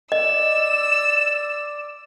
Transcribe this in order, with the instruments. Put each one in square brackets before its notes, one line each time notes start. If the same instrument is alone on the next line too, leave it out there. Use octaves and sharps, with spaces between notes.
[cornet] D5 [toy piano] D#5 [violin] E6